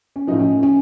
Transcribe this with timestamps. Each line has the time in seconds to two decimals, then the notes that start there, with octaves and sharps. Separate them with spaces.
0.16 C#4
0.27 A2 F3 D#4
0.39 C#4
0.63 C#4